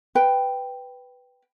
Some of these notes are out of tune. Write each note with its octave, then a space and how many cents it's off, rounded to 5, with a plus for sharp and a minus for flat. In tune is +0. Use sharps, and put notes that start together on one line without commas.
B4 +5 G5 +0